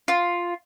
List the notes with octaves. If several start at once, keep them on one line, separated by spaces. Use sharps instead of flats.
F4